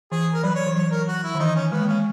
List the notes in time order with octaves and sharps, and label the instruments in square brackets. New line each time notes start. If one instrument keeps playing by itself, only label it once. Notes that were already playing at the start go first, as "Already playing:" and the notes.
[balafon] E3 [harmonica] G#4
[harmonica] A#4
[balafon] F#3 [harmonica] B4
[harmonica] C#5
[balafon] E3
[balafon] F#3 [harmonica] C#5
[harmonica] A#4
F#4
E4
[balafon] D#3
[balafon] E3 [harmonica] D#4
[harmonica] C#4
[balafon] G#3 [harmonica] B3
[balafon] A#3
[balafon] G#3 [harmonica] C#4